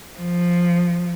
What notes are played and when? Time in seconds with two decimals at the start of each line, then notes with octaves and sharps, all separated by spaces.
0.18 F3